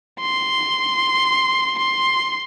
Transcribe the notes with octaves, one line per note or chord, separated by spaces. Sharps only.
C6
C6